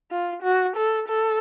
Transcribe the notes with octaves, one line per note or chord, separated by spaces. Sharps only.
F4
F#4
A4
A4